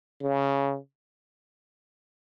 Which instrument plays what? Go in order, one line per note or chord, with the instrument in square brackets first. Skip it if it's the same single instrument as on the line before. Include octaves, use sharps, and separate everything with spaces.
[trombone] C#3